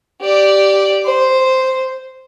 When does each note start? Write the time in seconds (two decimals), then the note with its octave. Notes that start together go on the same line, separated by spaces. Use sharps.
0.21 G4 D5
1.05 C5